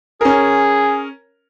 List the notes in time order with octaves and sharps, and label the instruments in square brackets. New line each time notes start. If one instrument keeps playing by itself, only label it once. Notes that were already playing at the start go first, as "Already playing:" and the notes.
[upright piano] C#4 A#4 [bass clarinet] G#4